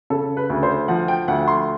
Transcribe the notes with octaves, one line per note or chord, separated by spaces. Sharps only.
C#3 A4
B4
D2
C5
F3 F#5
G5
D2 F#5
C6